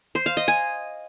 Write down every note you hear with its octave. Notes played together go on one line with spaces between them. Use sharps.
C5
F5
D#5
G#5